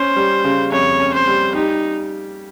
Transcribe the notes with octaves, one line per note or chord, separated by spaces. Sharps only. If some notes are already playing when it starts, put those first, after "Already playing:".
Already playing: C#4 C5
G3
C#3
F2 C#5
C#4
C5
G3
D#4 G4